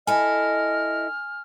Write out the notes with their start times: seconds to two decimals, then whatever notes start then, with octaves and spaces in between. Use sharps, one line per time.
0.07 E4 A4 D#5 G#5 F6